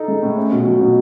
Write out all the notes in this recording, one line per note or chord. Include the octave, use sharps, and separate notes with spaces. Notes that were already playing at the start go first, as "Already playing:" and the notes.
Already playing: D#4 A4
G#3
A2
C#4
B2
F#3
B2